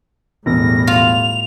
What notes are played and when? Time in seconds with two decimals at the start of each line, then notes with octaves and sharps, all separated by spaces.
0.46 E1 A2 G3 A#6
0.87 F4 F7